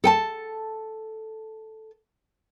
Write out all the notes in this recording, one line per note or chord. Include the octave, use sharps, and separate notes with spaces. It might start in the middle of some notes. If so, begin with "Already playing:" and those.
A4 G5 A5